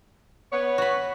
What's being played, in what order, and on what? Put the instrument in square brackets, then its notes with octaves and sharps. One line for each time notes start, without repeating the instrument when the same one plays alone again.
[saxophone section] B3 C#5
[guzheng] F#4 B5